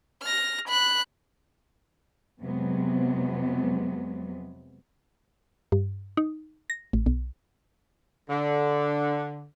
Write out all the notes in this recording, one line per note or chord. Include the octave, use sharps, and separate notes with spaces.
F6 A#6
B5 F#6
F2 C3 F#3 G#3 B3
G2
D#4
A#6
A1
B1
D3